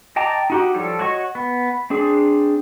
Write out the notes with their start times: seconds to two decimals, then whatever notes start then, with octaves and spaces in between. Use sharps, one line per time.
0.16 D#5 G5 A5 A#5 D6
0.50 D#4 F#4 G4
0.74 F3 G3 A4 C#5
0.99 F#4 C#5 D#5 C#6
1.35 B3
1.90 C4 D4 G#4